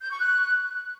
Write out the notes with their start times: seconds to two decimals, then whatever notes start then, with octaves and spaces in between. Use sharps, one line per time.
0.01 G6
0.10 C#6
0.19 F#6